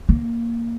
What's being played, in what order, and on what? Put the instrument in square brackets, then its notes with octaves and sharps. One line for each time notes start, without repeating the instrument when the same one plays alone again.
[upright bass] A#3